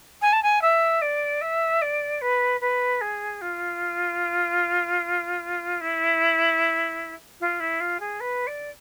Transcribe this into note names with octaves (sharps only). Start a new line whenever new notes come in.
G#5
A5
G#5
E5
D5
E5
D5
B4
B4
G#4
F4
E4
F4
E4
F4
G#4
B4
D5